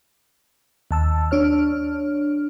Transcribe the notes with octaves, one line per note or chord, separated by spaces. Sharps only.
D#2 A5 E6
D4 C#5 F6